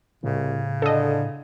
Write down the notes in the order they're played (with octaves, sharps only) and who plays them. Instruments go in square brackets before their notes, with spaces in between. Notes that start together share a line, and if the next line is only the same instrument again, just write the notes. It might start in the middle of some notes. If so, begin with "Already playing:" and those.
[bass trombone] C2 [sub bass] A2 [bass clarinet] C#3
[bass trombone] D3 [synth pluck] A4 D#5